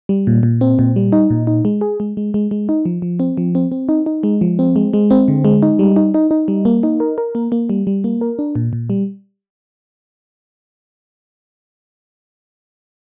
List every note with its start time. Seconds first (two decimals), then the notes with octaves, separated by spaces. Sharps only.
0.09 G3
0.27 A#2
0.43 A#2
0.61 C4
0.79 A#2
0.96 G3
1.12 D#4
1.30 A#2
1.47 D#4
1.65 G#3
1.81 G#4
2.00 G#3
2.17 G#3
2.34 G#3
2.51 G#3
2.69 D#4
2.86 F3
3.02 F3
3.20 C4
3.37 F3
3.55 C4
3.72 C4
3.89 D#4
4.06 D#4
4.23 G#3
4.41 F3
4.59 C4
4.76 G#3
4.93 G#3
5.11 C4
5.28 D3
5.45 G#3
5.63 D#4
5.79 G3
5.96 D#4
6.14 D#4
6.31 D#4
6.48 G3
6.65 A#3
6.83 D#4
7.00 A#4
7.18 A#4
7.35 A#3
7.52 A#3
7.69 G3
7.87 G3
8.04 A#3
8.21 A#4
8.39 D4
8.55 A#2
8.73 A#2
8.90 G3